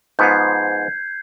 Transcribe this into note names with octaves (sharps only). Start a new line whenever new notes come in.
G#2 F3 B3 G6 G#6 C7